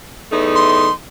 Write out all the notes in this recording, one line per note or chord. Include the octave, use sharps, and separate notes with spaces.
E2 A3 D#4
C6